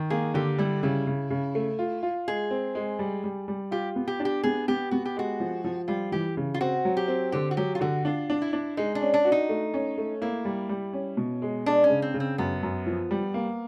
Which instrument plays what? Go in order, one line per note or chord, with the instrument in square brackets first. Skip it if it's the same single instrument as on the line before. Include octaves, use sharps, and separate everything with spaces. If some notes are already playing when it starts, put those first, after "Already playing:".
Already playing: [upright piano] D#3
[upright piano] A#3 [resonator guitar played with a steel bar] G#4
[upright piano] D3 [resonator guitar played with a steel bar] G4
[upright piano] G3 [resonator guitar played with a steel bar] E4
[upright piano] C#3 [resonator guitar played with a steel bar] E4
[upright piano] C#3
C#3
A3
F4
F4
[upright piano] G#3 [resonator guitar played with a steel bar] G#4
[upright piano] C4
G#3
G3
G3
G3
[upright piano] F4 [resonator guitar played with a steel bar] G4
[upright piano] B3
[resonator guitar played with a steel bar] G4
[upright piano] D4
[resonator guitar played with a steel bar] G4
[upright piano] B3 [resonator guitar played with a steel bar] G#4
[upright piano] B3 [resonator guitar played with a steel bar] G4
[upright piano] B3 [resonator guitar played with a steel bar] F#4
[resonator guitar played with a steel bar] G4
[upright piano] G#3 [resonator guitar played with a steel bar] F#4
[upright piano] F3
F3
[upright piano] G3 [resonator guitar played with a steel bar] F4
[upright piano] E3 [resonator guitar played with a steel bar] G4
[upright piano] C#3
[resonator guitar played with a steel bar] F4
[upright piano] C4 [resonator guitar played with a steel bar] F#4
[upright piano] F#3
[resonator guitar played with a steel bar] G4
[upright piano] C4
[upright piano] D3 [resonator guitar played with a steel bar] G4
[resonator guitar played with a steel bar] F#4
[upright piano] F#3 [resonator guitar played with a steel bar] G4
[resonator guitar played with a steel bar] F4
[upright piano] D3 [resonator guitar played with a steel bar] F#4
[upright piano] D4 [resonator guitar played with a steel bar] F4
[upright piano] D4
[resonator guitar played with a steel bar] E4
[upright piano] D4
[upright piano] G#3 [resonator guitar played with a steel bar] D#4
[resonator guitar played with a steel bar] D4
[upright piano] C#4
[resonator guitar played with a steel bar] D4
[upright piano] F#4
[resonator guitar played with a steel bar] D#4
[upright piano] A3
C#4
A3
[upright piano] A#3 [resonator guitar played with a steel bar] E4
[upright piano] G3
G3
C#4
B2
G#3
[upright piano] G#3 [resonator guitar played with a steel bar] D4
[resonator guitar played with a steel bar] C#4
[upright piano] C#3
[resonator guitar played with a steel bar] C4
[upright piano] C#3
[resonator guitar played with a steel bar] C4
[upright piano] F#2 [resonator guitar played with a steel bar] B3
[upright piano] F#2
F3
G3
A#3